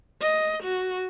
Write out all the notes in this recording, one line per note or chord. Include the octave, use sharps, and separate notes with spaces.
D#5
F#4